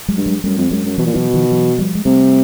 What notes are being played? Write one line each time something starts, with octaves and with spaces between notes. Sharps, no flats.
F#3 G#3
G2
F#3 G#3
F#2 G3 A3
F2
F#2 F#3 G#3
F#2
B2 E3 F#3
A#2
B2 E3 F#3
D#3 F3
E3 F#3
F3 G3
G#3
C3 G3 A3